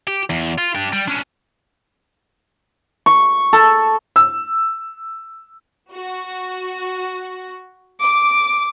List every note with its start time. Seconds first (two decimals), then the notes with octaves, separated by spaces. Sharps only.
0.07 G4
0.30 E2
0.58 F4
0.75 D4 G4
0.93 G3
1.08 C#4 D4
3.06 C#6
3.53 A4
4.16 E6
5.90 F#4
8.05 D6